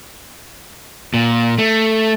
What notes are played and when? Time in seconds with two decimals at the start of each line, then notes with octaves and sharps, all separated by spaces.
1.14 A#2
1.58 A3